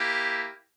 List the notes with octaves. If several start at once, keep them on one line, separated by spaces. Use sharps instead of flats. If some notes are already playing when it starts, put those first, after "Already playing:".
Already playing: A#3 E4 G4